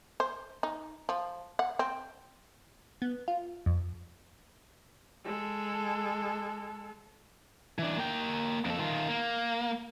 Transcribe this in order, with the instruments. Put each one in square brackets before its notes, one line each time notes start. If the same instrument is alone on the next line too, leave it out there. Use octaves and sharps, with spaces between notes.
[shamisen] C5
D#4
F3
F#5
C4
[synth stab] B3
F4
F2
[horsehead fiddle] G#3 A4
[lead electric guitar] E3 D4
A#3 G5
F2 A4
D#3 F4
A#3